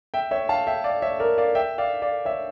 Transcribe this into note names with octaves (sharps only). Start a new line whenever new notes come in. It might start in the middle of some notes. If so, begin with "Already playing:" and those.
E5 G5
C#5 E5
F5 A5
E5 G5
D5 F5
C#5 E5
A#4 D5
D5 F5
E5 G5
D5 F5
D5 F5
C#5 E5